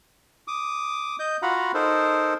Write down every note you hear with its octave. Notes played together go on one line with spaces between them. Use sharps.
D6 D#6
D#5 G6
F4 F#4 F5 F#5 A#5 B5
D#4 A4 A#4 C5